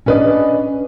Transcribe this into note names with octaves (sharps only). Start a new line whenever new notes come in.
C#4 D4 B4 D5 D#5